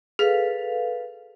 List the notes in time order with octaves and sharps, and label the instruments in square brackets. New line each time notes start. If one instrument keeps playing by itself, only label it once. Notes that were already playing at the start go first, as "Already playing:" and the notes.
[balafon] G#4 [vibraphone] A4 B4 F5